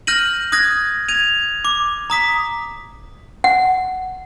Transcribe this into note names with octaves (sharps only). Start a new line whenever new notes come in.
F6 G6 A#6 D#7 F#7
D#6 F#6 G#6 A#6
G#6 D#7 F7
D6
A#5 D#6 B6
F#5